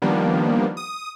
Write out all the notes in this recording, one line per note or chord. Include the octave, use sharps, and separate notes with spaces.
D#3 F3 G3 A#3 B3 D4
D#6